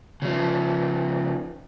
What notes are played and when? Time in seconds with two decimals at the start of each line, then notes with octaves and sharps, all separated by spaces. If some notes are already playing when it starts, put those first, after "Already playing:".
0.22 C#3 F3